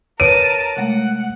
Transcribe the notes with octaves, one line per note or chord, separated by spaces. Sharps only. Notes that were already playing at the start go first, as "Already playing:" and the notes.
A#4 B4 C#5 A5 D7 D#7
C3 G#3 A3 F#5